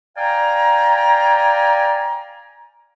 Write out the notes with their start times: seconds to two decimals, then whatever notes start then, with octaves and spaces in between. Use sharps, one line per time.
0.17 D5 F5 G5 G#5 A#5